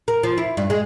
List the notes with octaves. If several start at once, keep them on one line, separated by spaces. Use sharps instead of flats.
A#4
F3
E4
G2
G#3